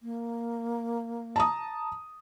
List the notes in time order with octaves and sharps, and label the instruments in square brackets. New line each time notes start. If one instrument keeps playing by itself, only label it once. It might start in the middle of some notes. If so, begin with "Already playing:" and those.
[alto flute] A#3
[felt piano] A5 A#5 D#6